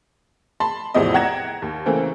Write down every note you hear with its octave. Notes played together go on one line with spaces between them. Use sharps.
A5 B5 C6
E2 A2 C3 F3 E4 D#5
F#5 G5 A#5 G#6 A#6 E7
D#2
C#3 E3 A3 A#3 C4